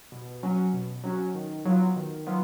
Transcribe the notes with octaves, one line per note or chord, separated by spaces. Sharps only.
B2
F#3 C#4 F#4
B2
F#3 C#4 F#4
D#3
F#3 B3 F4
D#3
F#3 B3 F4